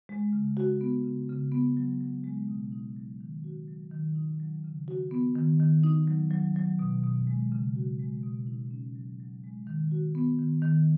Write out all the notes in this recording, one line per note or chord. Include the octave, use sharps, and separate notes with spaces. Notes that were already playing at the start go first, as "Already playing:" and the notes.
G#3
C#3
F#4
B3
C#3
C#3
B3
F#3
F#3
G#3
B2
D#4
F#3
D#3
F#4
F#3
D#3
D#4
F#3
C#3
F#4
B3
D#3
D#3
D#4
F#3
F#3
F#3
B2
B2
G#3
C#3
F#4
G#3
B2
D#4
C#4
F#3
F#3
G#3
D#3
F#4
B3
D#3
D#3